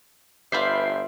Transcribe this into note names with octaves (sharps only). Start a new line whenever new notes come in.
G1 F4 B4 D5 E5 B5 G6 C7